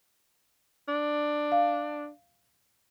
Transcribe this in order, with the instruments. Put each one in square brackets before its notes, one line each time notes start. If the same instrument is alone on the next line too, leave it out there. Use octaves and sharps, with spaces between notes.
[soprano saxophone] D4
[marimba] F5